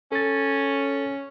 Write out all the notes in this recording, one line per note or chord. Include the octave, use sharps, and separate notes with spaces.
C#4 A4 A6